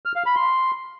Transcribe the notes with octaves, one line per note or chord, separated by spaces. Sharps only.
F6
F5
B5
C6